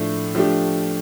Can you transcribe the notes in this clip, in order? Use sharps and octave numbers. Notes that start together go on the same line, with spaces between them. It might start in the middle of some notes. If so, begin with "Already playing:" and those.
Already playing: A2 F3 A3 D4
F3 A3 D4 G4